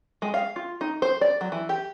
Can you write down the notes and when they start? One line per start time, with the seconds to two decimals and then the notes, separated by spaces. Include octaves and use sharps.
0.22 G#3
0.34 F5
0.56 F4
0.81 D#4
1.02 C5
1.21 D5
1.41 F#3
1.52 E3
1.69 G4